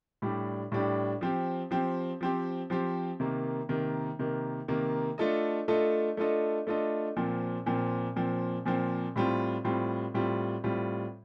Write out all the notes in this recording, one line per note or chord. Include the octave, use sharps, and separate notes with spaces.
A2 G3 D4 G4
A2 G3 D4 G4
F3 C4 G4
F3 C4 G4
F3 C4 G4
F3 C4 G4
C3 D#3 A#3
C3 D#3 A#3
C3 D#3 A#3
C3 D#3 A#3
A3 D4 F4 A4 D#5
A3 D4 F4 A4 D#5
A3 D4 F4 A4 D#5
A3 D4 F4 A4 D#5
A#2 F3 C4
A#2 F3 C4
A#2 F3 C4
A#2 F3 C4
A2 G3 C4 F4
A2 G3 C4 F4
A2 G3 C4 F4
A2 G3 C4 F4